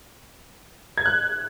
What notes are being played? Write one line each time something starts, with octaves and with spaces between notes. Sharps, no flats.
G#6
F#6